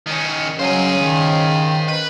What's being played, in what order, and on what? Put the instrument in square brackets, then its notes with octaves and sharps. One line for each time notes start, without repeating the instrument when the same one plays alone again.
[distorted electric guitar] D#3 C#4
[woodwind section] C#3 C#4 [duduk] F#3 [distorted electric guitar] C5 D#5
[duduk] D#3
[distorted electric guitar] B4